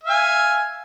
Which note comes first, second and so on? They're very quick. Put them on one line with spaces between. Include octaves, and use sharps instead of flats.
E5 F5 G#5